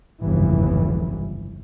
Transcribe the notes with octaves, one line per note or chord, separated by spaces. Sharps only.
G1 C2 F2 G#2 C#3 E3